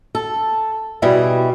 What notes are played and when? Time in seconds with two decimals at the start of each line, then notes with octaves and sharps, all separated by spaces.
0.15 A4
1.02 B2 G3 E4 G#4